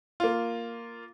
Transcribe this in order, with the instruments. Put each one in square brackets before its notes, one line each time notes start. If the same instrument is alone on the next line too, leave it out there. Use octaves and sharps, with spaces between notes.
[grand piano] A#3 F4